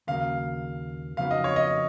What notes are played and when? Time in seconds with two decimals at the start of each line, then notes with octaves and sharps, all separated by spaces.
0.07 D#2 C#3 F#3 A#3 F5
1.17 F2 C#3 F#3 B3 D#4 F5
1.31 D#5
1.44 C#5
1.56 D#5